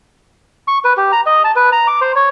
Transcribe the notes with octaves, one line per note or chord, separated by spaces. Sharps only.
C#6
B4
G4
A#5
D#5
A5
B4
A#5
D6
C5
C#5